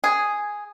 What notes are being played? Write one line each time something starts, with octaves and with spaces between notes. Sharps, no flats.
G#4